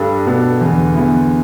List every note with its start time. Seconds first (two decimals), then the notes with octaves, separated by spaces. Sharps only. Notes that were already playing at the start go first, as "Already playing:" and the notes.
Already playing: G2 G3 D4 A4
0.26 B2 B3 D4 A4
0.61 E2 D3 B3
0.95 E2 D3 B3 E4